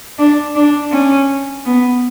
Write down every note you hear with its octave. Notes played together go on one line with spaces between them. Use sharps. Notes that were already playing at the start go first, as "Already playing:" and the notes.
D4
D4
C#4
B3